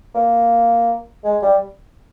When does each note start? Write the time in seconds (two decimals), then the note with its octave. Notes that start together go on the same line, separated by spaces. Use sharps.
0.15 A#3
1.24 G#3
1.42 G3